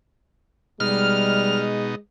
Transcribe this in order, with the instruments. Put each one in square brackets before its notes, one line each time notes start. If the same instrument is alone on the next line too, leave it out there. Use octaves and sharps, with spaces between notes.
[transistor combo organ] B2 D#4 [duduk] G3 [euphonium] G#3 [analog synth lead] F6